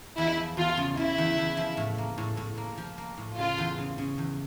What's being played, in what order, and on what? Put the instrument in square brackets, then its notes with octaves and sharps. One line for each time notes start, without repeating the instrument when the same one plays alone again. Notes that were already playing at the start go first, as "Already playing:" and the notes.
[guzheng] E2 [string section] E4
[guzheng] F3
[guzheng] E2 [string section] F4
[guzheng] C#3
[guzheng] C#3 [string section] E4
[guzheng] E2
E2
F3
A2
A#3
A2
A2
A#3
F3
A#3
A2
[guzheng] C#3 [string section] F4
[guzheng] E2
C#3
C#3
E2